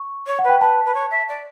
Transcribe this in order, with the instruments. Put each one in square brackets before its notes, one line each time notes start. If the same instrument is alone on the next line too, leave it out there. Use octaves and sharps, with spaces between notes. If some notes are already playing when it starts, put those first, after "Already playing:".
Already playing: [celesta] C#6
[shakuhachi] C#5
[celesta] F#5
[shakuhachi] B4 [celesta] G5
[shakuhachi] B4 [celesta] A5
[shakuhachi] B4
C#5
E5
D5